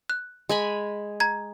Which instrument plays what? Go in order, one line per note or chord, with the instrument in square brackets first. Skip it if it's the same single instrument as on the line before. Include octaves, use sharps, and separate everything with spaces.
[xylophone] F#6
[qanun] G#3 G#5 B5
[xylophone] A#5 G#6